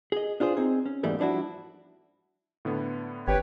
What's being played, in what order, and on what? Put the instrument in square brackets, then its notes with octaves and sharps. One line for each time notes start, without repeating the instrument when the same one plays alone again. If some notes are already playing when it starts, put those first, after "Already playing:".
[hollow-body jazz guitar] G#4 D#5
D4 F4 G#4 C5
C4 D#4 G#4
C#4
E2 G#2 E3 G3 A3 A#3
F3 G3 D4 E4 F#4
[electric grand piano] A2 D3 B3
[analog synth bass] G#1 [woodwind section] G4 B4 C#5